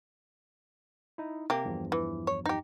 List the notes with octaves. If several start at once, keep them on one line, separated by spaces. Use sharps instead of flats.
D#4 E4
C3 A#3 G4
E2 G2 F3
E3
C#5
D#4 G4